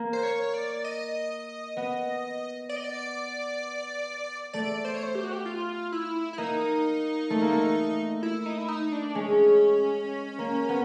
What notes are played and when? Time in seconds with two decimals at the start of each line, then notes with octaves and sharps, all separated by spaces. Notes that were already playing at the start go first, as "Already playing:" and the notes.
Already playing: A#3
0.13 C5
0.23 C#5
0.54 D5
0.84 D#5
1.77 B3
2.69 D5
2.76 D#5
2.84 D5
4.53 A3 D5
4.85 C5
4.94 C#5
5.03 C5
5.15 G4
5.24 F#4
5.32 G4
5.46 F4
5.92 E4
6.33 E4
6.38 A#3 D#4
7.30 A3
7.41 A#3
7.52 A3
8.23 E4
8.46 D#4
8.58 E4
8.68 D#4
8.92 D4
9.15 G#3 C#4
10.39 A#3
10.69 B3